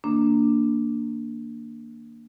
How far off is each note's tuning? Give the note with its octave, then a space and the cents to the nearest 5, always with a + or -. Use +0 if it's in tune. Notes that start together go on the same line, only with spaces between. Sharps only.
D#3 +0 A#3 -10 D4 +0